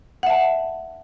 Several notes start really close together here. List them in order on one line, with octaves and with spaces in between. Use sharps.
F#5 E5 A5